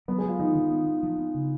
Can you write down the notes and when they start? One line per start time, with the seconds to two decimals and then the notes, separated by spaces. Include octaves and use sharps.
0.08 F#3 B3 B4
0.18 G#3 G#4
0.24 F#3
0.29 F4
0.39 D#3 D#4
0.55 D#3
0.71 B3
0.86 B3
1.03 F3
1.18 B3
1.34 C#3